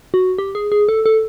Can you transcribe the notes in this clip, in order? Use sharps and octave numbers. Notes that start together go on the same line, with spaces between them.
F#4
G4
G#4
G#4
A4
A4